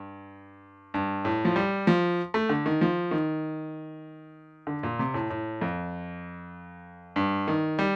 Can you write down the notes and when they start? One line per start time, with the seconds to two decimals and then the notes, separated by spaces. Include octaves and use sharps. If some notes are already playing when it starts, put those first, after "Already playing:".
Already playing: G2
0.94 G2
1.25 A2
1.45 F3
1.56 G3
1.87 F3
2.34 A3
2.49 D3
2.66 D#3
2.81 F3
3.11 D#3
4.67 D3
4.83 A#2
4.99 C3
5.14 A2
5.30 A2
5.61 F2
7.16 G2
7.48 D#3
7.79 G3